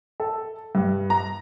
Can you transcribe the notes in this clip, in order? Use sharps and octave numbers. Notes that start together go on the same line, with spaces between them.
A4
G2
A#5